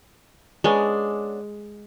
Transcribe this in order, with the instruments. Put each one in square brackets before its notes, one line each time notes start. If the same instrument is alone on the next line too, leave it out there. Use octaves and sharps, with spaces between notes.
[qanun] G#3 [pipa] B3 C#4 D4